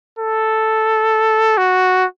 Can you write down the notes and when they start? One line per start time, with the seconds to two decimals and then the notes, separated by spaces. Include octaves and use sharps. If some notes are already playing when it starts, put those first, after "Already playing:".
0.19 A4
1.58 F#4